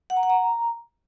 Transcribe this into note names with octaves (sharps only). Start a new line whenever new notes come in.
F#5
A#5
F#5
A#5